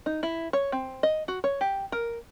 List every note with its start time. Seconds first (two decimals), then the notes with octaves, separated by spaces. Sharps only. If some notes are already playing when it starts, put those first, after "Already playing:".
0.06 D#4
0.23 E4
0.53 C#5
0.72 C4
1.03 D#5
1.28 F#4
1.44 C#5
1.61 G4
1.92 A#4